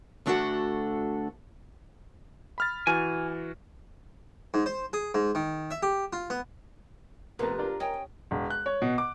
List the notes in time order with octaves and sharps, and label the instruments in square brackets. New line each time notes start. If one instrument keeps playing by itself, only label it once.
[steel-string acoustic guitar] D2 A3 D4 F#4 A4 F#5
[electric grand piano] B5 F6 A6
[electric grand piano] E3 F#4 F6 [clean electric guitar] G#5
[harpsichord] G#2
C5
G#4
G#2
D#3
E5
G4
F4
B3
[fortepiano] F2 A3 B3 [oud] C3 [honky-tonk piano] A#4 A#5 [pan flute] B4
[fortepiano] D4 F4 D5
[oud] C#4 [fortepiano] D#5 G#5 [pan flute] G5
[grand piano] E1
F#6
C#5
B2
D6